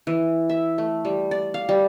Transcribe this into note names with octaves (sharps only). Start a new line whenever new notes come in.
E3
E5
A3
G3
D5
F5
G3